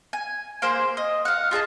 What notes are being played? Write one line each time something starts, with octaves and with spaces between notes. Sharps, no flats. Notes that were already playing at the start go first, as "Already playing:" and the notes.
G#5
A#3 G#4 C5
D#5
F5 F#5
F4 G#4 D#5 A5